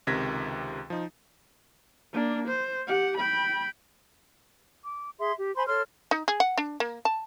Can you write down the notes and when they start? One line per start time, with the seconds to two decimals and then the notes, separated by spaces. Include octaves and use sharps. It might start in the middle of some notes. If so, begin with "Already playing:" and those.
0.07 C#2 C3 D#3 G#6 A#6 B6
0.90 F3 D#4
2.13 A#3 D4
2.48 C5
2.87 G4 F#5
3.17 G5 B5
4.84 D6
5.18 G#4 E5 C6
5.36 G4
5.56 C5 G#5 B5 C6
5.67 A4 C#5 C6 F6
6.11 D#4
6.28 G#4
6.40 F#5
6.58 D4
6.80 A#3
7.05 A5